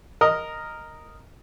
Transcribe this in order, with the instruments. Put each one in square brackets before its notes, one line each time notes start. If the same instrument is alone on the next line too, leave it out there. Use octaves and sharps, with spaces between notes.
[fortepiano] A#4 D#5